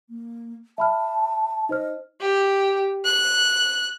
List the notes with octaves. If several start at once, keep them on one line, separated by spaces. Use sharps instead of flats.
A#3
E5 A5 B5 F6
D#4 C5 D#5 F6
G4
F#6